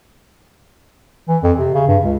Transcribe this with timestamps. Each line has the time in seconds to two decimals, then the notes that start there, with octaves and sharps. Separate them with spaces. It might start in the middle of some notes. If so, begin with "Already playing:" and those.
1.28 E3
1.43 F2
1.58 C3
1.74 C#3
1.88 G2
2.04 C#2